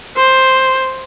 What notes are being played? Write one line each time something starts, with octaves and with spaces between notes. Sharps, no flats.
C5